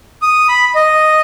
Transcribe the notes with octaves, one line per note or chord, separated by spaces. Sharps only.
D#6
B5
D#5